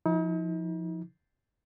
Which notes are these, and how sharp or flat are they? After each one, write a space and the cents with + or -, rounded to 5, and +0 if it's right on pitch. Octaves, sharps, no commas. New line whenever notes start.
F3 +0 D#4 +40